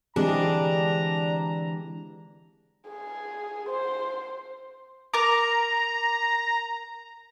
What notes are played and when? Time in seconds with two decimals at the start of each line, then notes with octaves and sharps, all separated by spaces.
0.16 D3 E3 G#3 C4 D4 G4 G#4 A#5
2.89 G#4
3.69 C5
5.14 A#4 A#5 D6